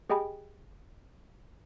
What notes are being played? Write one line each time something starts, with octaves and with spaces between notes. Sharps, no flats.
G4 G#4 D#5 G5 G#5 B5